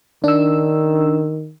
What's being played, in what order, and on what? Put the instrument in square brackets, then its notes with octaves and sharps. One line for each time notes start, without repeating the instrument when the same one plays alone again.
[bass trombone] D#3 [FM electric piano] D4 E6